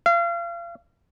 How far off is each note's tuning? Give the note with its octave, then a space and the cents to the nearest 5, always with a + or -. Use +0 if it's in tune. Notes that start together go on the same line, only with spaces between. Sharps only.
F5 -35